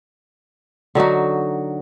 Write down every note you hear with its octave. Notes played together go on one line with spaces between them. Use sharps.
D3 F#3 D#4 F#4